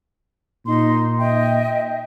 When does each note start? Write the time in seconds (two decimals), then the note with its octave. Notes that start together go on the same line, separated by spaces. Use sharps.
0.65 A#2 D#4 C6
1.18 D#5 E5 G5